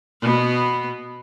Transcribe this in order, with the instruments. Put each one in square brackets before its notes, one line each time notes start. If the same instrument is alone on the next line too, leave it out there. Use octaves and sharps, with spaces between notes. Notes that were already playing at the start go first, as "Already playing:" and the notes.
[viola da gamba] B2 B3